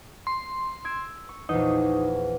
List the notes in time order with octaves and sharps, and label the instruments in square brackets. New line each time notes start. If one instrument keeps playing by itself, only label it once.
[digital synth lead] C6
[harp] E6 G#6 D7
C#6
[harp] A#1 E2 [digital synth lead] D#4